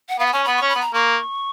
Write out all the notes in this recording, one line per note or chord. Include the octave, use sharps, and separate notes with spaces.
F#5
B3 F5
F#5
C#4 G#5
B3 B5
C#4 C#6
B5
B3
A#5
A#3 C#6